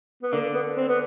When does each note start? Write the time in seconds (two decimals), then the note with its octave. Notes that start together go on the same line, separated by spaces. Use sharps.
0.23 B3
0.33 D3 A#3
0.54 B3
0.77 C4
0.88 B3